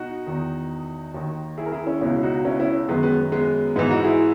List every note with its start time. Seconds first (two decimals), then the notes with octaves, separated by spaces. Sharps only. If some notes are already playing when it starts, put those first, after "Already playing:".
Already playing: B2 D#4 F#4
0.26 E2 D#3
1.14 D#2 D#3
1.58 E4 G#4
1.66 A#4
1.72 E4 G#4
1.87 C#4 E4
2.01 C#2 B2 C#4 E4
2.23 D#4 F#4
2.45 C#4 E4
2.60 C#4 E4
2.89 F#2 D#3 G#3 B3
3.03 G#3 B3
3.32 G#3 B3
3.76 G#2 E3 B3 D#4
3.91 D#4 F#4
4.05 E4 G#4